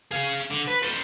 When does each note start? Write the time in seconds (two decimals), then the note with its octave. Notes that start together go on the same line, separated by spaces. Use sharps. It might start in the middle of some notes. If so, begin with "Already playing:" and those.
0.11 G#4 F5
0.51 D3
0.67 B4
0.82 A4 C5